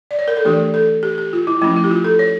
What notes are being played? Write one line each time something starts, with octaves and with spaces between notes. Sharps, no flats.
D5
C#5
A#4
A4
E3 A3 D4 G4
A4
G4
G4
F4
E4
F3 A3 C#4 E4
E4
G4
F4
A4
C#5